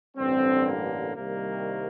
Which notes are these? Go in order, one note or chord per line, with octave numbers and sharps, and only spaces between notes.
A1 G2 D3 G3 C4
A#3
C2 C3 D#3 G3 A#3